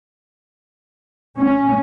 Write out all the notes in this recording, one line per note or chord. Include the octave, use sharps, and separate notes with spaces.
C#4